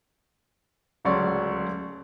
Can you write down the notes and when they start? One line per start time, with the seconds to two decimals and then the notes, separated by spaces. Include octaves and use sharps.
1.05 D1 C#2 F#3 C#4 D5 C#6